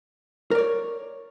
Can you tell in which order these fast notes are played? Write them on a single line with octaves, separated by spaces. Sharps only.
A#4 D5 C#5